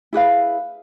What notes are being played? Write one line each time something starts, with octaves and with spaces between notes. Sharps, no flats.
E4 G#4 B4 F5